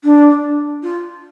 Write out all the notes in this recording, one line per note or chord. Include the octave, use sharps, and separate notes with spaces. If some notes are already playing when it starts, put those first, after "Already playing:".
D4
F4